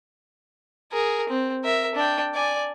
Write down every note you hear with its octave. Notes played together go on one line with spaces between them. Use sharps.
G#4 A#4
C4
A#4 E5
D4 G5
D5 G#5